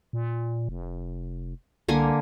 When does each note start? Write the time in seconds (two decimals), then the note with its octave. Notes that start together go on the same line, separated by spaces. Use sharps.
0.13 A#2
0.69 F1
1.88 C2 D3 A#3 G#5